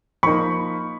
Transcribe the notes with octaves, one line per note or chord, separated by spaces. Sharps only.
F3 A#3 D#4 B5 C#6